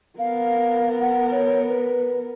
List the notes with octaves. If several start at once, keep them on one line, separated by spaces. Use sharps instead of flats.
B3 A#4 F5
F#5
C#5
B4